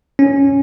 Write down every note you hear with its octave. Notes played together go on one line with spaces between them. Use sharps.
C#4